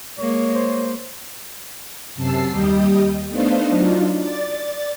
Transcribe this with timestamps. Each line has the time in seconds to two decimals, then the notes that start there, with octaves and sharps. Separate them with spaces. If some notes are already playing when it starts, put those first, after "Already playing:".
0.19 G#3 A#3 C#5
0.55 C5
2.15 F#2 C3 A5 E6 C7
2.50 D#2 G3 G4 D#5 D#6
3.29 A3 B3 D4 D#4 C5 F5
3.69 F#3 D4 D#4 F4
4.19 D5 A6